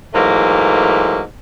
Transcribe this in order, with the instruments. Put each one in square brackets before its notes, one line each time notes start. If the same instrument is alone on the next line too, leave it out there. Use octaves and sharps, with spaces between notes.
[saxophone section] G#2 E3 F#3 A3 A#3